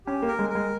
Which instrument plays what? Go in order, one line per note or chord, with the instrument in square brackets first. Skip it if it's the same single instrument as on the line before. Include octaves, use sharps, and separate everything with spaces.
[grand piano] C#4 [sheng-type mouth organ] G4
[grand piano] A#3
[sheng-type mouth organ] A#4
[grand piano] G#3
[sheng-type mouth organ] A#4
[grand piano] G#3